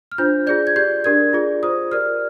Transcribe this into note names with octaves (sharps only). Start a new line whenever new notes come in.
F6
D4 F4 C5 G6
F4 G#4 D5 G6
G#6
G4 D5 G6
D4 G4 A#4 D5 G#6
F4 G#4 D5
F4 C5 D#6
G4 A#4 D5 F6